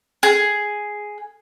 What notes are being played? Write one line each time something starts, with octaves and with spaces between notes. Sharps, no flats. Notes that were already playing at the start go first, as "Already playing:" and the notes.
G#4